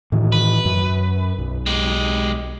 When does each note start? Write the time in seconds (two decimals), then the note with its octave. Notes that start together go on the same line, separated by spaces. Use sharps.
0.12 A2 D#3 E3
0.32 B4
0.65 F#2
1.38 B1
1.66 G#3 G4